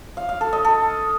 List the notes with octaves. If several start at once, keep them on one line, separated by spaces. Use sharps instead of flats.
F5
F5
A4
D#5
A4